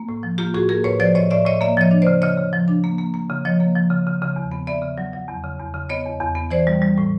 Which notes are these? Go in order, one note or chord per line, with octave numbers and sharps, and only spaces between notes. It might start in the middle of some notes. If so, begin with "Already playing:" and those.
Already playing: A#3
A2
F3
A#3 F4 G4
A2 F#4 G#4
A#3 G#4 A#4
A2 B4 C#5
F3 C5 D5
A2 C#5 D#5
A2 D5 E5
A2 C#5 D#5
A#3 D5 E5
F3 C#5 D#5
D4
C#3 C5 D5
C#3 C#5 D#5
C#3
F3
D4
A#3
A#3
A#3
C#3
F3 C#5 D#5
A#3
F3
C#3
C#3
C#3
E2
B3
B3 D5 E5
C#3
F#3
F#3
E2
C#3
E2
C#3
B3 C#5 D#5
E2
E2
B3
E3 C5 D5
G3
G3
A2